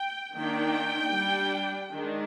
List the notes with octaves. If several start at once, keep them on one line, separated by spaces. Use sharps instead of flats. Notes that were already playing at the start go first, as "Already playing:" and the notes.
Already playing: G5
D#3 A#3 D4 G5
G3 D4
D#3 G#3 D4